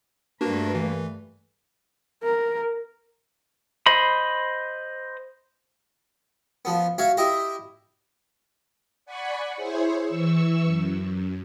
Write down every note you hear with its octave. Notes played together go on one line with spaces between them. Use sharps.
G2 A3 A#3 D4 F#4 B4
E3
A#4
C5 D#5 B5
F3 B3
F#4 C#5 E5 F5
E4 G4 D#5 E5
D5 F#5 G#5 B5 C#6
E4 G#4 C5 C#5
E3 C#6 E6
F#2